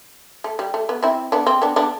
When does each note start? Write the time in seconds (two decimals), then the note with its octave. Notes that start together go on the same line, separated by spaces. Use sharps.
0.44 A3
0.59 G3
0.74 A3
0.89 B3
1.02 C4 E4
1.32 B3 D4
1.47 C4
1.62 B3 D4
1.76 B3 D4